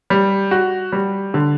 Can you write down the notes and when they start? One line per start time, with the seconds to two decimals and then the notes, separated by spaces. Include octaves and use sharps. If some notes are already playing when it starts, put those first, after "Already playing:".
0.10 G3
0.51 F#4
0.92 G3
1.34 D3